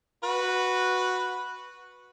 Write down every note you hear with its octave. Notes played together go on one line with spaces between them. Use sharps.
F#4 B4